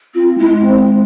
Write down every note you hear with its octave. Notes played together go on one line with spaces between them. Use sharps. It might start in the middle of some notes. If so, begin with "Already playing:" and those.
C4 F4
G#3 E4
C4